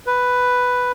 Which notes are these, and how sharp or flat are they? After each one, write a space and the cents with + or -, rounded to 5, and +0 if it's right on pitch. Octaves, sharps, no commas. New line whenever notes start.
B4 +5